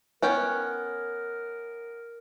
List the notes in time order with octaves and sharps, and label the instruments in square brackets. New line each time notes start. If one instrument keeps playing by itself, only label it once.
[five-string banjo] B3 C#4 G5 [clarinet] A#4